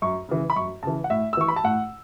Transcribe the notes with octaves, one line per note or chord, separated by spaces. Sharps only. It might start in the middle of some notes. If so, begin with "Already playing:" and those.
F#2 C#6
C#3 E3
B5
F#2 C#6
C#3 E3 A5
F#5
A2 E5
E6
E3 C#6
B5
A5
A2 F#5